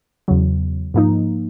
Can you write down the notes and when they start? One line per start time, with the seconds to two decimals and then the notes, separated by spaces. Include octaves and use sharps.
0.28 E2 C#3 F#3
0.94 G#2 F3 A#3 D#4